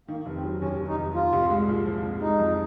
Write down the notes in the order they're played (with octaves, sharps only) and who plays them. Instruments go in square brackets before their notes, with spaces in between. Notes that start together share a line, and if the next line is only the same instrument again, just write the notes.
[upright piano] D#3 [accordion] A#3
[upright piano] F1
[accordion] C4
[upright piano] F#3
[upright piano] D#2 [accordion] C#4
[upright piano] D#3
[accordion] D#4
[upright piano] F1
[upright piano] F3 [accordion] F4
[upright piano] C2
G#3
A#2
F3
C2
[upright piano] G#3 [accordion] D#4
[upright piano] F2